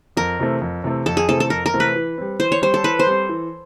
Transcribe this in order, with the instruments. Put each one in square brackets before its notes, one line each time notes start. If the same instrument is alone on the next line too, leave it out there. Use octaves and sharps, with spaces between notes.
[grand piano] F2 [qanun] A#4
[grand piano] C3 E3 A3 C4
F2
C3 E3 A3 C4
[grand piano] F2 [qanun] A4
[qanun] G#4
[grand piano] C3 E3 A3 C4 [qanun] A4
[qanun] A4
[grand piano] F2 [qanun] A#4
[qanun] A#4
[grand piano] C3 E3 A3 C4
[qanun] B4
[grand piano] E3
G3 C4
[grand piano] E3 [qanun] C5
[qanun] C#5
[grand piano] G3 C4 [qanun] C5
[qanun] A4
[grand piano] E3 [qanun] B4
[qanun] C5
[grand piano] G3 C4
E3